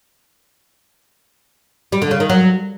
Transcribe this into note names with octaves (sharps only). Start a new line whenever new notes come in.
G3
D3
C#3
D#3
F#3